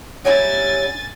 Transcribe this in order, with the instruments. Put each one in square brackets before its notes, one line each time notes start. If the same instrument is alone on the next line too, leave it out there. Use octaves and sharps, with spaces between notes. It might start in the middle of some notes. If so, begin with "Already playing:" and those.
[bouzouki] F#3 G3 E4 [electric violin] G#5 A6